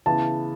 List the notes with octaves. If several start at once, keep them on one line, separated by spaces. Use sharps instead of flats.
C#3 E3 B3 E4 A5